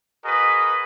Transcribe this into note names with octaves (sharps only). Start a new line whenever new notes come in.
F#4 G#4 A#4 B4 D#5